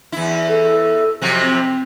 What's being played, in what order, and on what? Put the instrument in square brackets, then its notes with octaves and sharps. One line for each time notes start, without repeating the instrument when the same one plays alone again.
[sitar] E2 E4
[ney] A4
[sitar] F2 C3 F#3
[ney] C4